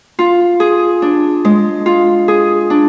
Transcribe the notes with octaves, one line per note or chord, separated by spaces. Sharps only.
F4
G#4
D4
G#3
F4
G#4
D4